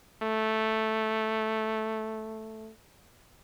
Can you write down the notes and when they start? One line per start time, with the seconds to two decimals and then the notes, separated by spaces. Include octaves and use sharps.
0.22 A3